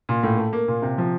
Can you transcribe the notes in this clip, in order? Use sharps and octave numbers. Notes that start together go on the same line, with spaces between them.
A#2
A2
A3
A#3
A#2
C3
F3